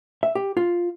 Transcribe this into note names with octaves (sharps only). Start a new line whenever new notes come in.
E5
G4
F4